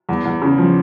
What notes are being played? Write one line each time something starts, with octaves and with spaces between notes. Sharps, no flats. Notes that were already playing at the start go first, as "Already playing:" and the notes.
E2
E2
C#3
F3